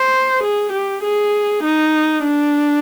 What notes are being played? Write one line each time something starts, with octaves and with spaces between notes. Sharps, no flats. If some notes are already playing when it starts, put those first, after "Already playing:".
Already playing: C5
G#4
G4
G#4
D#4
D4